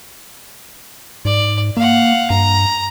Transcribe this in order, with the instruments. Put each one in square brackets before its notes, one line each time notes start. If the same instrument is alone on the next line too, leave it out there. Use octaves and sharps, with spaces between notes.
[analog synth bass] G#2 [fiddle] D5
[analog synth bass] A#3 [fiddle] F5 F#5
[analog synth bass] G2 [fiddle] A#5